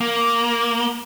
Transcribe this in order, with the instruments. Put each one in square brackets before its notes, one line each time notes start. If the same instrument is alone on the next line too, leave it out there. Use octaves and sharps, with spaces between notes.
[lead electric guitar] A#3